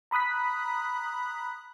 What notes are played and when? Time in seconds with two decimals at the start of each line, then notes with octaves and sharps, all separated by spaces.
0.11 A#5 B5 D#6 F#6 B6